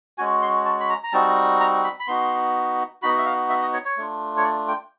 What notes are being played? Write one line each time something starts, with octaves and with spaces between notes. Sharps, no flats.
G#3 C#4 F#4 G#5
C6
A5
B5
A#5
A#5
G3 C4 D#4 F#4 A5
A#5
B5
B5
B3 D#4 F#4 C6
B3 D#4 F#4 B5
E5
F5
E5
D#5
C#5
C#5
A3 D4 F4
C#5
D5
G5